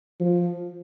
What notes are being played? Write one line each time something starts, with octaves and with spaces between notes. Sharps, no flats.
F3